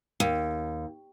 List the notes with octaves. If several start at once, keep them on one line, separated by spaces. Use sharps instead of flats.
D#2